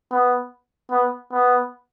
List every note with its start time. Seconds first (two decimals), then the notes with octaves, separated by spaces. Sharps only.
0.12 B3
0.91 B3
1.32 B3